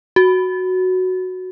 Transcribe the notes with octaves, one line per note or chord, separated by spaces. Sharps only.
F#4